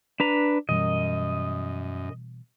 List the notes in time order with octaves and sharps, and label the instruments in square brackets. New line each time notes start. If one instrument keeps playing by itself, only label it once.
[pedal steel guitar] D4 B4 A#5
[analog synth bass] F#2 [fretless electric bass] B2 E3 G3 [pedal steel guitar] D#5